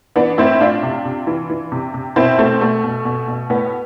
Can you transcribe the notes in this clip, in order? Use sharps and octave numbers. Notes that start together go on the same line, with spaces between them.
E3 B3 D4
A2 C4 E4
A2 D4 F4
C3
C3
E3
E3
C3
C3
B2 C4 E4
B2 A3 C4
B2 A3
B2
B2
B2
A2 B3